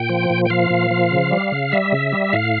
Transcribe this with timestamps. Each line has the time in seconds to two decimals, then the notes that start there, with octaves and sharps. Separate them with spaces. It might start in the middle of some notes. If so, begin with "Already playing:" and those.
Already playing: A#2 G5
0.09 F3
0.30 A#2
0.45 G5
0.50 F3 F5
0.70 A#2
0.91 F3
1.11 C#3
1.31 G3
1.52 C#3
1.72 G3 E5
1.92 C#3
2.12 G3
2.33 A2 F5